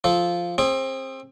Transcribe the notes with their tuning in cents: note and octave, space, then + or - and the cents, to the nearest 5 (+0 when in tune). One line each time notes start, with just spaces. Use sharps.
F3 +0 A4 -15
C4 +25 G#4 -10